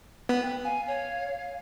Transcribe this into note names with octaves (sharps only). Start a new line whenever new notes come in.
B3
G5
F5 G#5
C#5